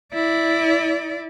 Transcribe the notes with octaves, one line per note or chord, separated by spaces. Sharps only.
E4 D5